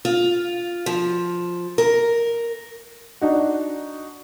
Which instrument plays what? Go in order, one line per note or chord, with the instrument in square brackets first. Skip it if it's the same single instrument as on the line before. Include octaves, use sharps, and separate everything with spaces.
[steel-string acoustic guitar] F4
F3
A#4
[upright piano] D4 D#4 F#4